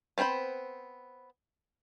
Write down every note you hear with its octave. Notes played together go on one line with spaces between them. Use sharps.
B3 C4 G#4 C5 B5